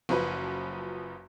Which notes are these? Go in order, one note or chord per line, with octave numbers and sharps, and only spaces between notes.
F#1 F#2 F3 B4